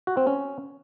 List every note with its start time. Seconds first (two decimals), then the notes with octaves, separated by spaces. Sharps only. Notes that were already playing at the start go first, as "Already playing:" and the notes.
0.07 F#4
0.17 C4
0.27 C#4